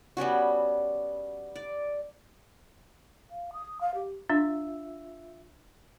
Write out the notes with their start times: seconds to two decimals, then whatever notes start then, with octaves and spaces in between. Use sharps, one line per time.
0.17 G3 B3 C#4 F#4
1.56 D5
3.30 F5
3.53 D#6
3.80 F5
3.94 G4
4.30 D4 F4 E5